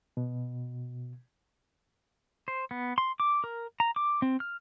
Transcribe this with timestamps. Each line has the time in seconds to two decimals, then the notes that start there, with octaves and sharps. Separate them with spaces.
0.17 B2
2.48 C5
2.71 B3
2.98 C6
3.20 D6
3.44 A#4
3.80 A#5
3.96 D6
4.22 C4
4.40 F6